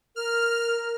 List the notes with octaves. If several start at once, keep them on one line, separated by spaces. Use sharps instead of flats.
A#4 F6